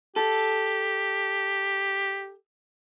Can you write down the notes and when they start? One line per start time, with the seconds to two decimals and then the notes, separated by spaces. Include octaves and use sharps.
0.16 G4 A4